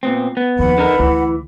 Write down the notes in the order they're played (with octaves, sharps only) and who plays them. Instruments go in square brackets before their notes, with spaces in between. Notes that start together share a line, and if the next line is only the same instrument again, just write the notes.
[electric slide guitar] A#2 B3 C4
B3
[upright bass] D#2 F3 [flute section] B4 F#5 B5
[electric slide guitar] D3 D#4 A#4
[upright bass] D2 [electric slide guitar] E3